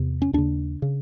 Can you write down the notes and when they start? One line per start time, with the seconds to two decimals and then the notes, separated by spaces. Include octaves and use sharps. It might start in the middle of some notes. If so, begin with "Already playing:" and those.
Already playing: E2 C3
0.22 C#4
0.33 D#2 C#3 D4
0.82 C#3